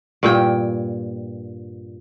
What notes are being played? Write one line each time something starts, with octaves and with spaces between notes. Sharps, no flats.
G2 A#2 G5